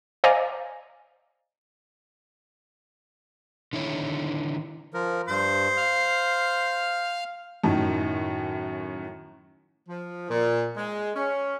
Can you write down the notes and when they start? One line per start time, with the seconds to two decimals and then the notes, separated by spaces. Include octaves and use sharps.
0.24 C5 D5 D#5 F5 G#5 A#5
3.73 D3 D#3 E4 C#5
4.94 F3 A#4
5.28 G2 C5
5.77 F5 F6
7.64 F#2 A2 D#3
9.89 F3
10.30 A#2
10.76 G#3
11.15 C#4